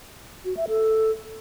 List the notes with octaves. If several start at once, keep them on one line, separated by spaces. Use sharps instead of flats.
F#4
E5
A4